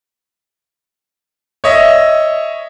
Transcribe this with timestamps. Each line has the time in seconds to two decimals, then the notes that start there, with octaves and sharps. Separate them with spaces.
1.64 C#5 D#5 E5